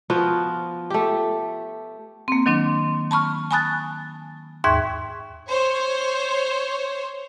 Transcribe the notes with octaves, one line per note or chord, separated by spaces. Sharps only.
F3 B3 F4 F#4
A3 G4
A#3 C4
D#3 F#3 C4 D4
A5 B5 C#6 F6
G#5 A5 B5 D#6 F#6 A6
D#2 G#2 E5 C#6 G#6
C5 C#5